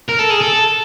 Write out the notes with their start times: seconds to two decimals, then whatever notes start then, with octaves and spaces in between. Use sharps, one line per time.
0.09 A#4
0.19 A4
0.30 G#4
0.41 A4